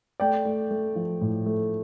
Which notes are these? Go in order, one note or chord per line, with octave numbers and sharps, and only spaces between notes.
A3 D5 G5
A3
A3
F3
A2
A3